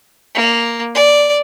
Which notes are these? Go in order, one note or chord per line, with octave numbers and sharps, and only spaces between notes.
A#3
D5